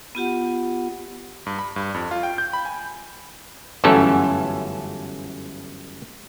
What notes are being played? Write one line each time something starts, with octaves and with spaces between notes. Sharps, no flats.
B3 F4 G4 F#5
G2
B5
G2
F2
F4
G5
G6
B5
G#5
G1 F#2 E3 A3 C#4 A4